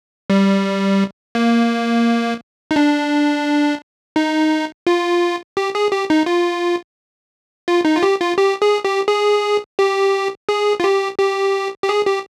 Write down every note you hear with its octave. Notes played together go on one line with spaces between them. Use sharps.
G3
A#3
D#4
D4
D#4
F4
G4
G#4
G4
D#4
F4
F4
D#4
F4
G4
F4
G4
G#4
G4
G#4
G4
G#4
F4
G4
G4
G4
G#4
G4